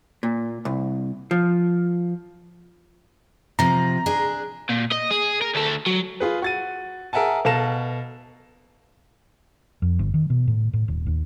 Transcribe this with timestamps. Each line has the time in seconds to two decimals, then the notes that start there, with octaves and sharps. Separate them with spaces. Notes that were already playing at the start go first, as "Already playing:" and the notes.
0.23 A#2
0.65 C2
1.31 F3
3.59 C3 F3 A#5
4.06 D4 G#4
4.70 A#2
4.92 D#5
5.11 G#4
5.41 A#4
5.55 D2 A4
5.86 F#3
6.20 F4 G#4 B4
6.42 F#4 A6 D#7
7.13 G#4 A#4 E5 F#5 G#5 A5
7.45 B2 A4 F5 A5 A#6 E7
9.82 F2
9.99 G1
10.14 D#3
10.30 B2
10.47 A2
10.73 A2
10.88 D#1
11.06 D#2